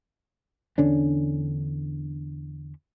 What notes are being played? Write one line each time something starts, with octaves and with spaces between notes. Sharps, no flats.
E2 D3 C#4 D4